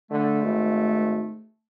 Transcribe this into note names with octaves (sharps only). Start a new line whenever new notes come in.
D3 A3
G#1